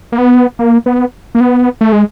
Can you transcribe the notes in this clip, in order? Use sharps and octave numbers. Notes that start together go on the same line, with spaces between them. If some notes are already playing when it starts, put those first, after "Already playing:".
A#3
B3
A#3
B3
A#3
B3
A3
G#3